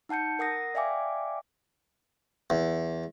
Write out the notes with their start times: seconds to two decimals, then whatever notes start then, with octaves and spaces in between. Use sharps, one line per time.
0.09 D#4 F#5 A5 G6 C#7
0.39 A#4 F#5 D#6 A#6
0.74 D5 E5 F5 G5 G#5 D6
2.50 E2